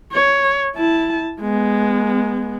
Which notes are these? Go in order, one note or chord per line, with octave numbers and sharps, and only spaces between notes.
C#5
E4 A5
G#3 B3